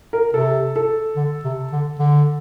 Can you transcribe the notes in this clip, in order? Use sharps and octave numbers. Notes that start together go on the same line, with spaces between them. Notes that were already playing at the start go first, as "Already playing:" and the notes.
A#4
C3 A4
A4
D3
C3
D3
D3